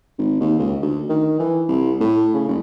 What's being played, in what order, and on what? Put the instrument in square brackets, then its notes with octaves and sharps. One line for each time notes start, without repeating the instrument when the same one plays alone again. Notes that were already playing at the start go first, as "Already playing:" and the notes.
[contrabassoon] G#1
D#2
C#2
D2
D#3
E3
C2
A2
C#3
F#1